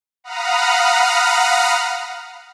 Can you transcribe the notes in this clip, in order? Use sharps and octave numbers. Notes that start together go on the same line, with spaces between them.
F5 F#5 A#5 B5 D#6 F6